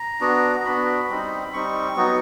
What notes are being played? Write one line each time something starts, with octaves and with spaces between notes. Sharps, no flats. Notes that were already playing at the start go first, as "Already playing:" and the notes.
Already playing: A#5
B3 D4 F#4
B3 D4 F#4 B5
G3 C4 D#4
G3 C4 D#4 C#6
F#3 B3 D#4 F#4